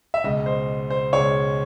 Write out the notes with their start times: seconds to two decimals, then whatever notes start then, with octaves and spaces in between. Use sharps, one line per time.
0.14 E5
0.24 C#2 B2 G#3 D#5
0.46 C5
0.90 C5
1.13 C#2 B2 G#3 C#5